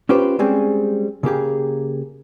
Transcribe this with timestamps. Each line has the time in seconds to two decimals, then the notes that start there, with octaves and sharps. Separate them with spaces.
0.09 C#4 F4 G4 B4 C5
0.39 G3 G#3 C4 C#4 G#4
1.23 C#3 A#3 G4 G#4